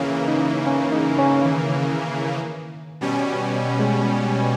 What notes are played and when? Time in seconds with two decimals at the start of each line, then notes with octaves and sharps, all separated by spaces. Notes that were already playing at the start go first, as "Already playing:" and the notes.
Already playing: C#3 E3 A#3 C#4
0.28 D#4
0.67 C#4
0.92 D#4
1.19 C#4
1.45 D#3
3.01 B2 G3 C#4
3.79 G#3